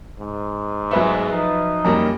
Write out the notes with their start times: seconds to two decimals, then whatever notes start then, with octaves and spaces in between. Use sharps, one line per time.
0.19 G#2
0.91 F#3 A3 G#4 B4 E5
1.32 F3 D#4
1.85 F#2 G3 A#3 A#5